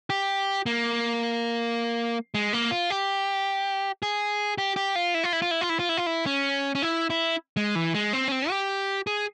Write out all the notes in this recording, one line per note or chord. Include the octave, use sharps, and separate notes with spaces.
G4
A#3
G#3
A#3
F4
G4
G#4
G4
G4
F4
E4
F4
E4
F4
E4
F4
E4
F4
E4
F4
E4
C#4
C#4
E4
E4
G#3
E3
G#3
C4
C#4
C4
G4
G#4